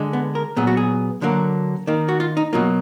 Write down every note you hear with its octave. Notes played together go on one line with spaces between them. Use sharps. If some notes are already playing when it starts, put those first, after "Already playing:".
Already playing: D3 G#3
B3
A#4
A#2 F#3 B3 G#4
F#4
G#4
D3 F#3 A#3
D#3 A#3
F#4
F4
D#4
B2 F#3 A#3 F4